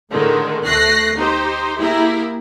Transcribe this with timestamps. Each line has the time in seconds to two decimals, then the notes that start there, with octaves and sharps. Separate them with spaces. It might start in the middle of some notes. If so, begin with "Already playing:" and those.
0.11 A2 D3 D#3 G#3
0.65 D2 A3 F#6 A#6 C7
1.16 D#4 G4 C5
1.77 A#3 E4 G4 G#4 A#4